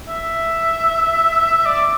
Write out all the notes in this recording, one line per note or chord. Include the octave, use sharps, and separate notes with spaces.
E5
D5